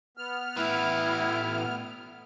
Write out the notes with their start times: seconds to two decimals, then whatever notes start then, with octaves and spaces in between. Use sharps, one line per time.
0.17 B3 F6
0.57 A2 E4 B4